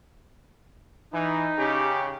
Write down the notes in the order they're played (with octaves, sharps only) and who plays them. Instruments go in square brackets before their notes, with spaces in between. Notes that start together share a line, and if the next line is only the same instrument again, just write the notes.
[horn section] E3 [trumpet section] D#4
[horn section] C#3 C#4 G4